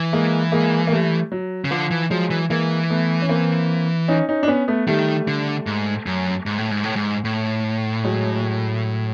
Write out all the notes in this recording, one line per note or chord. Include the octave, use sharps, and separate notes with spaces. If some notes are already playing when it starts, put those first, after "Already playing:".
Already playing: E3
G#3 A#3
G#3 A#3
A#3
G3 A3
F#3
C#3
D3 F3
E3
F3 F#3 G#3
E3
E3 G#3 A#3
A3 B3
C#4
A#3 C4
C#4 D#4
C#4 D#4
D4
B3 C#4
A3 B3
D#3 G3 A3
D3
G#2
F#2
G#2
A2
G#2
A2
G#2
A2
F#3 G#3